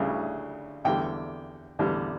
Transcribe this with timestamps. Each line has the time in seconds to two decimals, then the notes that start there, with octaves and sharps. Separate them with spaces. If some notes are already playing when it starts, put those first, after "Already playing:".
Already playing: D2 C#3 G3
0.85 E2 D3 G3 G5
1.79 E2 D3 G3